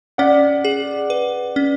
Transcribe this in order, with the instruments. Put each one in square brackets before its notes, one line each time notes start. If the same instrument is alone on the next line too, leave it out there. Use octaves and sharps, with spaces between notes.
[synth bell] C#4 [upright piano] D5 F#5
[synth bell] G#4
B4
C#4